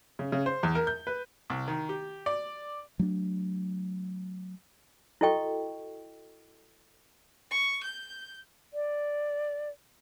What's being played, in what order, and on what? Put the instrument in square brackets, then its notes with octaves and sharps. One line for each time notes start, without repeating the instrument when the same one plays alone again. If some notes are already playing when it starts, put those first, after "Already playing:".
[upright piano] C#3
C#3
C5
E2
A#4
G6
B4
[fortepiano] C2
D#3
G4
D5
[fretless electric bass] F#3 A3 B3 D4
[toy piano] E4 F#4 A4 D#5 G5 C#6
[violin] C#6
G6
[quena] D5